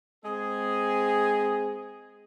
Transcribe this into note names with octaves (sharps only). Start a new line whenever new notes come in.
G#3 C4 G#4